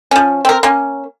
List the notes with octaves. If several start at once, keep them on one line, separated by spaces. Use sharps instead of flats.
F3 C#4
C4 A#4
A#3 C#4